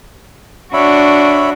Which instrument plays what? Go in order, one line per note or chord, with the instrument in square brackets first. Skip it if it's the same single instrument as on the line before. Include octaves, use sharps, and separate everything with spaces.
[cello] D4 F#4 [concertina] C#5 E5 B5